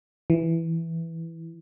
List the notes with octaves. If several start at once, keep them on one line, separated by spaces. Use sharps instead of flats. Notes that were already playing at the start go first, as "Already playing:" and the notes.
E3